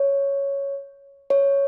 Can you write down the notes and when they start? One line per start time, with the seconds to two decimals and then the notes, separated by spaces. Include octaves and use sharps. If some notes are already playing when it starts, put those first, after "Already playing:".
Already playing: C#5
1.30 C#5